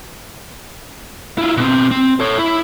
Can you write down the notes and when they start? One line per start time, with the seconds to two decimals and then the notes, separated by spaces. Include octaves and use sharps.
1.38 E4 F4
1.57 B2 C4
1.91 C4
2.20 A4 C#5
2.38 E4